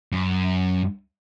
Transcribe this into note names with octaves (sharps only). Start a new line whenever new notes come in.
F#2